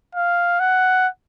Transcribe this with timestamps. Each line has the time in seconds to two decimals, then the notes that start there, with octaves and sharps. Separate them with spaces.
0.15 F5
0.60 F#5